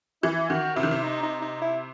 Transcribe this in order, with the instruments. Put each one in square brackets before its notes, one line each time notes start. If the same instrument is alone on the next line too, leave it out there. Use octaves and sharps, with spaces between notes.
[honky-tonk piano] E3 [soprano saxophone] E4
[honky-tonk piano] D#3 [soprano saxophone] F#4
[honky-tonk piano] C3 [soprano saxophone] E4
[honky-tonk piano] D#3
C3
[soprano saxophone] D#4
D#4
D#4
E4